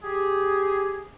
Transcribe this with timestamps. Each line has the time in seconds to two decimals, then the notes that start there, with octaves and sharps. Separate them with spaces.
0.03 G4 G#4